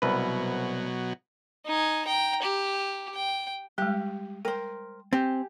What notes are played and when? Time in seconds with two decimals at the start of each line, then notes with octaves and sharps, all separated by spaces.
0.02 C2 B2 F#3 B4
1.66 D#4 G#5
2.06 G5 A#5
2.43 G4
3.15 G5
3.78 G3 G#3 G4
4.45 A#4 C5 G5
5.13 C4 G4 G#5